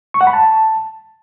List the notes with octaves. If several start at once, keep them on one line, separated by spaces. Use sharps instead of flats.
C#6
F#5
B5
A5